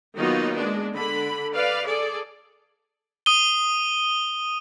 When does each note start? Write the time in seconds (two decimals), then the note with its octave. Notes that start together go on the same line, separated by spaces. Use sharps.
0.18 D#3 F#3 A#3 B3 D#4 F4
0.59 G#3 D4
0.93 D3 B5
1.56 B4 D5 F5
1.87 G#4 A4 D5
3.26 D#6 D#7 G7